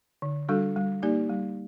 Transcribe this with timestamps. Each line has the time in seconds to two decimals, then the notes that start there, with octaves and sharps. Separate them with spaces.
0.22 D3
0.49 G3 D4 F#4 A4
0.76 G3
1.02 A#3 D#4 G4 D5
1.30 G3